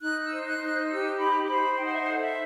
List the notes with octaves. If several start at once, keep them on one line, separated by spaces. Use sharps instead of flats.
D#4 F#6
E6
C5
F#6
D#4
F#6
G4 E6
D#4 B5
C5 B5
D#4 G5
F#5
E5
A4 F#5
D#5
E5